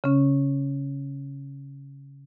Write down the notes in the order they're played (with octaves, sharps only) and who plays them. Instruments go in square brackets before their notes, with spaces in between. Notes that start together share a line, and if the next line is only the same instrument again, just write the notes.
[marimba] C#3 C#4